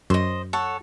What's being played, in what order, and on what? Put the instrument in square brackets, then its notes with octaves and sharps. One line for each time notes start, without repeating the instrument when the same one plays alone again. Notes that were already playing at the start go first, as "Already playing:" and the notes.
[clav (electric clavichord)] F#2 [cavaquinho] C5 D#5
[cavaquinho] A4 C#5 F#5